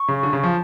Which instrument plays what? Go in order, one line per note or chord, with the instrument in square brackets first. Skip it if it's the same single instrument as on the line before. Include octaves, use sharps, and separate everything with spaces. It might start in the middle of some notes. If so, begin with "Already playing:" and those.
Already playing: [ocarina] C#6
[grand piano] C#3
D3
C#3
F3